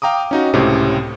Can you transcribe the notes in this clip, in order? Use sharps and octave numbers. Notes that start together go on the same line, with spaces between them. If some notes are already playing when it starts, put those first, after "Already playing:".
F5 G5 A#5 D6 D#6
C#4 D#4 F#4
C#2 A2 C3 C4 C#4